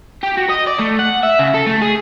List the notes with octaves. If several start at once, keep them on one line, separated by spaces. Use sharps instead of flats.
G4
F#4
D#5
D5
A3
F#5
E5
C#3
A4
A3
G#4